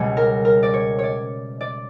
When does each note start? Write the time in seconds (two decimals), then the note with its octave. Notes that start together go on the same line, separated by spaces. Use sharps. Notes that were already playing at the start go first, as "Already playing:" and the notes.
Already playing: C#2 B2 G3 C#5
0.17 A#4
0.45 A#4
0.63 D5
0.74 C#5
0.99 C#5 D5
1.61 D5